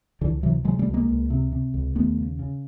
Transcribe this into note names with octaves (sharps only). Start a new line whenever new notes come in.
C#2 D3 E3
C3 E3 F#3
C3 F#3 G#3
G3 A3
C#2
G#3 A#3
C#2
C3
C3
C#2
D#2 A3 B3
C#3
C#3